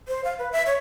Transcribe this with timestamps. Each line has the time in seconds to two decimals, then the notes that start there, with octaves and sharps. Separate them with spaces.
0.08 C5
0.24 F5
0.39 B4
0.52 E5
0.67 C#5